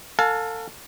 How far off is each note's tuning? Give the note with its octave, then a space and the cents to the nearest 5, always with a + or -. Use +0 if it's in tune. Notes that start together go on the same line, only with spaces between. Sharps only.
A4 +35 F5 +30 A5 -45